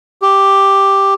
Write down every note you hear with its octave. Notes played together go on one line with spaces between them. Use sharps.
G4